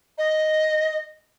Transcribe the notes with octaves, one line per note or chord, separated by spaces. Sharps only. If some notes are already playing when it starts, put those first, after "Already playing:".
D#5